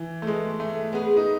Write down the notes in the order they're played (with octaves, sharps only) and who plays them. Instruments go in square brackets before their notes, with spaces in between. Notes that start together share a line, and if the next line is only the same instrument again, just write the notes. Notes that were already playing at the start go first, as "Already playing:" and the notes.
Already playing: [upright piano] E3
A3
[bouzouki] E3 B3 F#4 [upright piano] G#3
[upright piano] A3
[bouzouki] G#3 C#4 G#4 B4 [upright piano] B3
[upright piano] D#4